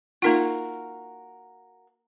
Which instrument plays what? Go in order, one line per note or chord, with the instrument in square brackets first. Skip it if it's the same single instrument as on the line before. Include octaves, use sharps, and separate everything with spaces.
[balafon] A#3 D#4 F4 [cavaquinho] F#4 A#4 F5